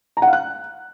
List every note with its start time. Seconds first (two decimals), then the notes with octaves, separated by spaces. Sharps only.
0.17 A#5
0.22 F#5
0.28 F5
0.33 F#6